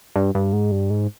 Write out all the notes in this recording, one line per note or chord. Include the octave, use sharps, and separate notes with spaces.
G2
G2
G#2
G2
G#2